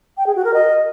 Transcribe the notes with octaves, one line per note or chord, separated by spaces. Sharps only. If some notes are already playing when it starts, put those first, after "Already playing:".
G5
G#4
F#4
A#4
D#5